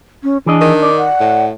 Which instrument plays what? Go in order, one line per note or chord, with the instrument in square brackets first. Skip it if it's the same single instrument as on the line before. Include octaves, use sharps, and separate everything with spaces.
[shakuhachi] C#4
[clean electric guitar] E3 G#4 D#5 [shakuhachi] D4
[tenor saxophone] D#3
[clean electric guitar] D5
[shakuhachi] F#5
[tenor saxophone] A2